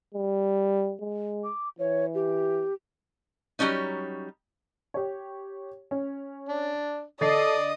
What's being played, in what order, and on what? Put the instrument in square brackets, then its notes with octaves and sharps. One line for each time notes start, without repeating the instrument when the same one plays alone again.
[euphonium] G3
G#3
[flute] D6
[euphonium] E3 [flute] C#5
[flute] G4
[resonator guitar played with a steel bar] F#3 G3 A3 C#4 D#4
[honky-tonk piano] G4 C#5
C#4
[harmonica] D4
[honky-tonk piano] D3 A6 C7 [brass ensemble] A4 [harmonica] D5 [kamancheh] D#5 D#6